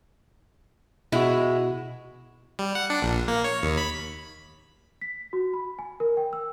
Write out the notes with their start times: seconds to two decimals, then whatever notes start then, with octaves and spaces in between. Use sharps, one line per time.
1.12 B2 G#3 E4 F#4
2.59 G3
2.75 F#5
2.90 D4
3.02 A#1
3.28 A#3
3.44 C#5
3.63 D#2
3.78 B5
5.01 B6
5.33 F#4
5.53 B5
5.79 G#5
6.00 A#4
6.17 G5
6.33 E6